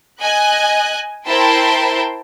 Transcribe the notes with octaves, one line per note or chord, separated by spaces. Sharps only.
D#5 G#5 F#6
E4 A#4 C5 G5 A5 C6